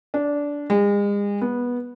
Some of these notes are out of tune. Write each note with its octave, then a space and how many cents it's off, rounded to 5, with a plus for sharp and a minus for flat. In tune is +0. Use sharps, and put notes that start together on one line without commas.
D4 -15
G#3 -40
B3 -15